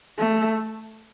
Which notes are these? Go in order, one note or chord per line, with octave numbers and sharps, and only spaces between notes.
A3